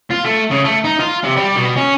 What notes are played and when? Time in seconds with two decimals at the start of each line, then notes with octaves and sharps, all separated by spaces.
0.11 F4
0.25 A3
0.51 C#3
0.65 A3
0.84 D#4
1.00 F4
1.23 C3
1.36 G3
1.56 B2
1.76 C#4